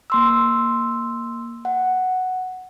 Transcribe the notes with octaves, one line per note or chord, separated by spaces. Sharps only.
A#3 C6 E6
F#5